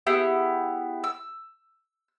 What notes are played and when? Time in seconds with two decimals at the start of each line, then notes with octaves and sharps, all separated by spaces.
0.07 B3 E4 G4 G#4
1.04 E6